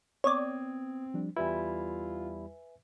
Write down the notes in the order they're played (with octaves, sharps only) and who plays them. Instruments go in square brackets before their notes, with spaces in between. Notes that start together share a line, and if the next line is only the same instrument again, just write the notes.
[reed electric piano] B3 D#6 G#6 [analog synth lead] C4 [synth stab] C#5 D5
[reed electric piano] F3 G3 D4
[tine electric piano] E2 G3 E4 [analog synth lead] F4 [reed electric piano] B4 E5 G#5